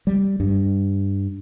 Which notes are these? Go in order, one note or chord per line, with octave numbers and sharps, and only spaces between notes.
G3
G2